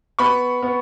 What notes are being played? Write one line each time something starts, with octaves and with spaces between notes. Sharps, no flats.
B3 B5 C#6
B3